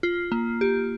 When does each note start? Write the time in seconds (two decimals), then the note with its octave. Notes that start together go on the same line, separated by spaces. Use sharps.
0.03 F4
0.32 A#3
0.61 G4